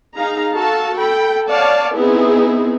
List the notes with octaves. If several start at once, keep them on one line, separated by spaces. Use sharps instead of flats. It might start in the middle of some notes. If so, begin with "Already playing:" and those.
D#4 G#4 F5 A#5
F#4 A4 F5 A5
A4 G5 B5
C#5 D5 F5 F#5 A5
B3 C4 D#4 E4 G#4